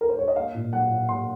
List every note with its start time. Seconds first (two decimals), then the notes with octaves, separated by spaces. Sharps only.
0.01 A#4
0.09 C5
0.19 C#5
0.28 D#5
0.36 A#3 F5
0.54 A#2
0.73 F#3 F#5
0.91 A#2
1.09 A#2 C6